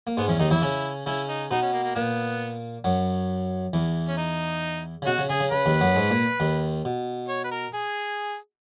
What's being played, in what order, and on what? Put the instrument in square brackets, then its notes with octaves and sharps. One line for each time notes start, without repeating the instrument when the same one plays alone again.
[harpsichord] A#3
[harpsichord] G#2 G#3 [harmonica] B3
[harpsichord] E2 E3 [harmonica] C#4
[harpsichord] D#2 D#3 [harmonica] D#4
[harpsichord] E2 E3 [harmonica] E4
[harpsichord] C#3 C#4
[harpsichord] C#3 C#4 [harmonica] E4
[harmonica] D#4
[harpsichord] B2 B3 [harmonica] D#4
[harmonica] C#4
A#3
A#3
[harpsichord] A#2 A#3 [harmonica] B3
[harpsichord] F#2 F#3
E2 E3
[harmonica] C#4
D#4
[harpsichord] C#3
[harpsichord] B2 [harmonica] F#4
[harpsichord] C#3
[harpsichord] C#3 [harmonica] G#4
[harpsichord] C#3
[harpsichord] C#3 [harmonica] B4
[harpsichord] D#2 D#3
F#2 F#3
G#2 G#3
A#2 A#3
D#2 D#3
B2
[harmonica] C#5
B4
A#4
G#4